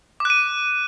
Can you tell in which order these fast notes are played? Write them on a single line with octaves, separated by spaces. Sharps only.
D6 F#6 D#7